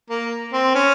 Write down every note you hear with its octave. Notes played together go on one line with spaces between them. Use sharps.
A#3
C4
C#4